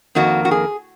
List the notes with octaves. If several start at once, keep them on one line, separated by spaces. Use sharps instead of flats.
F2 D#3 A#3 F#4
F#4
G#4